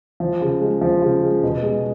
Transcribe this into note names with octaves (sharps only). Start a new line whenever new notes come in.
F3
C#3
G#3
F3
C#3
G#3
B2
G#3